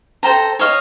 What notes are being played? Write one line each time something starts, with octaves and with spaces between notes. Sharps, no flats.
A4 C5 G5 A#5
C#5 D#5 F5